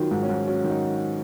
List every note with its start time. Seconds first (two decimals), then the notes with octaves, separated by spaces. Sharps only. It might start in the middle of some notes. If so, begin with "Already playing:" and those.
Already playing: D#3 F#3 F4
0.11 G#2
0.23 C#4
0.29 G#2
0.47 F#3 C#4
0.64 D#3
0.70 D#4